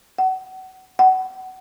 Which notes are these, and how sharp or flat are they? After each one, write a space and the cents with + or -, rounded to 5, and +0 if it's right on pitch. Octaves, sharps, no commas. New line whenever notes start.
F#5 +30
F#5 +25